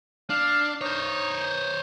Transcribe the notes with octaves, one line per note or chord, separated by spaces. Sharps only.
D4 F5
D#4 C5 C#5